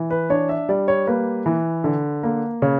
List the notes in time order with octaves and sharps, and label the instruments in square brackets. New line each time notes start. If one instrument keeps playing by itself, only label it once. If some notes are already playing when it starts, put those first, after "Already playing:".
Already playing: [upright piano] E3
B4
D4 C#5
E5
G3 D5
C#5
A#3 B4
E3
D3
A#3
C#3 C#5